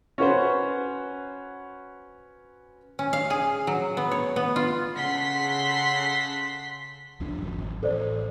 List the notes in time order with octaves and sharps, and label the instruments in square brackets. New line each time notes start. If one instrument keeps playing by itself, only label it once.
[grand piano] C#4 F#4 B4 C5
[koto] C#4
F5
G#4
F#3
B3
C#5
B3
F4
[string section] C#3 A4 F#5 C6 B6
[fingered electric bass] C2 F2 D4
G#1 F2 F#3
D#1 G#1
[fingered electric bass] A1 [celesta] A4 C5 D5